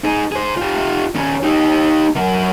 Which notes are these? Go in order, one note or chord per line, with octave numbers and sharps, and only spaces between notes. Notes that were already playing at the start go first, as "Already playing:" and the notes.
D#4 G#4
G#4 C5
F4 G4
D#3 C#4
D#4 G4
F#3 A#4